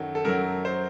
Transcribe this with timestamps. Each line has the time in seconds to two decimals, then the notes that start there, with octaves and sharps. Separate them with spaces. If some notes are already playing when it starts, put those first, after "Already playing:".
Already playing: F#2 D#3 F#3 A4
0.15 A4
0.25 F#2 F#3 A#4
0.65 C5